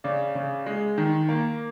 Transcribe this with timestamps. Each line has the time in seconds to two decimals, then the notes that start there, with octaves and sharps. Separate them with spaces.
0.04 C#3 D5
0.35 C#3
0.66 G#3
0.98 D#3
1.29 A#3